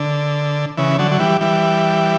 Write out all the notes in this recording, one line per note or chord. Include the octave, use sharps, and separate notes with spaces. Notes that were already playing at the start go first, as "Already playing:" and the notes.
Already playing: D3
C#3 E3
D3 F#3
F#3
E3 G3
E3 G3